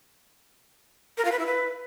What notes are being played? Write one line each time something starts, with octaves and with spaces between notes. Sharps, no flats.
A#4
F4
B4
E4
B4